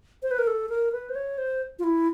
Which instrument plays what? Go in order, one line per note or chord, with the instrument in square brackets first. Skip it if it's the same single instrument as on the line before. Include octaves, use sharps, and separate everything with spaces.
[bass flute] C5
B4
A#4
A4
A#4
B4
C5
C#5
C5
F4
E4